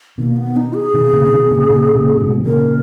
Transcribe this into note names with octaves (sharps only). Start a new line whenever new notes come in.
B2 D#3 A#3
B3
D#4
G#4
B2 D#3
A#2 C#3
C#3
B2 D#3
A#2 C#3
A#2 C#3
A#2 C#3
A#2
G#2 B2
D#3
A#2 C#3 A#4